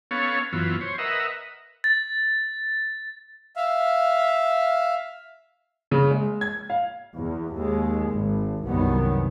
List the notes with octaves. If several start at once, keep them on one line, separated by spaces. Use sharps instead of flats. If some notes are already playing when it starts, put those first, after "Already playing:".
B3 C#4 A4 C#5 F5
F#2 E3 B3 F4
C5 C#5
A#4 B4 D#5 E5 F#5
A6
E5 F5
C#3
G#3
G#6
F5
E2
D#2 G#3
G#1
C2 F#2 D#3 B3